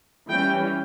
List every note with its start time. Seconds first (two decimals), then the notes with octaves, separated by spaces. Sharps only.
0.29 E3 G3 C#4 G5